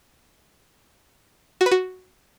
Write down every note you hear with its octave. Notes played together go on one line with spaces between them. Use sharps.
F#4
B4
F#4